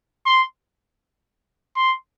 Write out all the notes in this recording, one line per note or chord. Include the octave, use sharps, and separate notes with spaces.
C6
C6